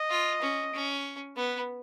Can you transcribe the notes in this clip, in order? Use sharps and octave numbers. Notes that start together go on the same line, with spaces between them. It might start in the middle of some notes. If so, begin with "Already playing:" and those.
Already playing: D#5
F4
C#4
C#4
B3 B4